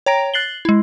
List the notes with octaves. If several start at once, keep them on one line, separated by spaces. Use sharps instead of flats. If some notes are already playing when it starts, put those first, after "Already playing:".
C#5 G5 A#5 A#6 D7
F#6 A6 C7 F#7 G7
G#3 E4